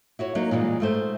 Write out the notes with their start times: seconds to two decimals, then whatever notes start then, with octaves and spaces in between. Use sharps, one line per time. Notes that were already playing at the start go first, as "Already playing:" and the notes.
0.19 E4 F#4 C#5
0.35 F#3 A#3 D#4
0.51 A#2 E3 F3 G3 G#3
0.80 G#2 A3 C5